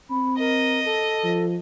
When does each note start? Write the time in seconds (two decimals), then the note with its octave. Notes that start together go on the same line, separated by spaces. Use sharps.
0.10 C4 B5
0.39 A#4 D#5
0.85 A4
1.23 F3